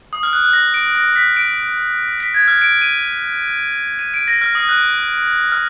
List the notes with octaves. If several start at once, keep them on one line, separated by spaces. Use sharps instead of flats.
D#6
F6
F#6
F#6
A#6
D7
A#6
B6
D7
B6
G#6
F6
D7
D#7
D#7
D7
A#6
F6
D#6
F#6
F6